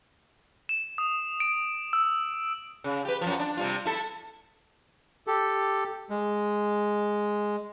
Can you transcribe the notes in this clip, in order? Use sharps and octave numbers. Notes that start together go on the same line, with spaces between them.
E7
D#6
D7
E6
C#3
G4 B4
F#2 F3
D4
C3 G3 F4
E4 A4
G4 A4
G#3